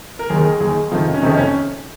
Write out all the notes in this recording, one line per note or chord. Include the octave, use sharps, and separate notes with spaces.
A#4
D#2 D#3 G#4
A#4
G#4
D#2 D#3 G#4
F2 C3 D#3 F4
C#4
F2 C3 D#3 D#4
C#4